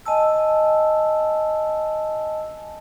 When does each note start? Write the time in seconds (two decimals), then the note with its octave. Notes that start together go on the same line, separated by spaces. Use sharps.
0.06 D#5 G#5 A5 E6